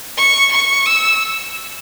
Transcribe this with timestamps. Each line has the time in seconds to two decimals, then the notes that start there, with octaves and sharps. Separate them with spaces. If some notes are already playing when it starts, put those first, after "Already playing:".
0.17 C#6
0.52 C#6
0.86 E6